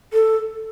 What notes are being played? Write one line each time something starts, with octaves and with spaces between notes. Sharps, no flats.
A4